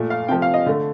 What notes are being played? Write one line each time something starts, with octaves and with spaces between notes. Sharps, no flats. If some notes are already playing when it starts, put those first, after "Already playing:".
Already playing: A#2 A3
F5
C3 F3 A3 G5
F5
D#5
D3 A3